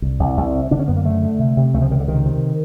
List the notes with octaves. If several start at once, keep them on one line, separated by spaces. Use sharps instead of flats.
C2
C2
C2
C3
D3 D4
C#4
F#2 B3
A#3
D3 A3
D3
C3
C3
C#2 A3
F3
C#2 D#3
D3
C3 D#3
C3